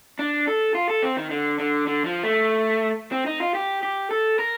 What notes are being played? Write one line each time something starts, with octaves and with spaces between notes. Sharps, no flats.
D4
A4
F4
A4
C4
D#3
D3
D3
D3
F3
A3
C4
D#4
F4
G4
G4
A4
A#4